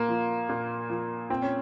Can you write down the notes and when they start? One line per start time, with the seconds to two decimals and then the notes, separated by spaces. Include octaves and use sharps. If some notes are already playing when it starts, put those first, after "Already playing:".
Already playing: A#2 A#3
0.08 F3
0.49 A#2
0.90 F3
1.30 A#2 C4
1.42 C#4